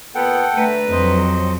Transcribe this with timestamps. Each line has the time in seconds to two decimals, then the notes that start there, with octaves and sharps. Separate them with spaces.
0.15 A#2 B3 A4 F#5 G5
0.55 D3 A3 B4 A#5
0.92 F2 F#3 C5 D#5